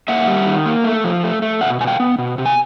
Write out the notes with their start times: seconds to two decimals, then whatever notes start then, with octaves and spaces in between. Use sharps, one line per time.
0.08 A#3 E5 F#5
0.28 G3
0.47 D#3
0.66 A#3
0.84 A3
1.04 F3
1.24 A3
1.42 A3
1.61 B2 E5 F#5
1.80 B2 G#5
1.87 F5 G5
2.00 B3
2.18 B2
2.38 C3
2.46 G#5